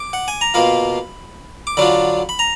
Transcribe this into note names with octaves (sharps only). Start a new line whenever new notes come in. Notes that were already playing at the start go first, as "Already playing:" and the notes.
Already playing: D6
F#5
G#5
A#5
B2 A#3 F4 B5
D6
D3 F#3 D4 F4 B5
B5
A#5